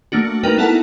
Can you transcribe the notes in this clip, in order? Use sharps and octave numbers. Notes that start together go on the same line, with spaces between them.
A3 A#3 D4 F#4
A#3 D#4 A#4 B4 G5
B3 E4 A4 A#4 F#5 A5